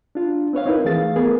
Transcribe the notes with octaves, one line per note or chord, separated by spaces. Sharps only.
D4 F4
C4 B4 C#5 F5
C4 D#4 E4 A#4 B4
E3 A3 G#4 F5 A6
B3 G#4 A#4